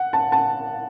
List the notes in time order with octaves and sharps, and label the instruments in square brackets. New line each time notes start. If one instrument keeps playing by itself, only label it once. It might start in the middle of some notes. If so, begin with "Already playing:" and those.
Already playing: [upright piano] F#5
A5
A5